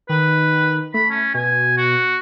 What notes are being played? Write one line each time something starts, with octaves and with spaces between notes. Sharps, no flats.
D#3 B4
A3 B5
C#4
B2 G#5
F#4